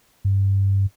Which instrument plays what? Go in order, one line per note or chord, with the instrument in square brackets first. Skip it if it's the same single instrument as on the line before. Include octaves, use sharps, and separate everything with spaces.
[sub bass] G2